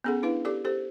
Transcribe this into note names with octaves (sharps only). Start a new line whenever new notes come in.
B3 C#4 G#4 A4 F#5
D4 E4 B4 F5
G4 A4 D5 D6
G4 A4 C5